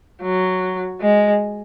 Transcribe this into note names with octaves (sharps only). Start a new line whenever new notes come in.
F#3
G#3